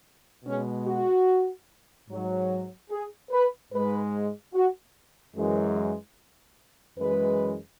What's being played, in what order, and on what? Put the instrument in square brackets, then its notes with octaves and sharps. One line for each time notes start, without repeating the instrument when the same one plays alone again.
[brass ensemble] B2 G#3 C#4
F#4
G#2 F#3
G#4
B4
G#2 G#3 B4
F#4
F#2 E3 G#3
F#2 E3 G#3 B4